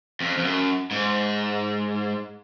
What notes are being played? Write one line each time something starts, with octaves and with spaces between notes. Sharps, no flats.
F2
F2
F#2
G#2